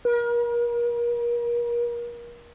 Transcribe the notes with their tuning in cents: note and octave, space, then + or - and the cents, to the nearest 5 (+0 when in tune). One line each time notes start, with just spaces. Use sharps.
A#4 +35